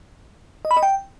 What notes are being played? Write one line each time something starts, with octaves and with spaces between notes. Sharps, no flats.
D#5
B5
D#5
G5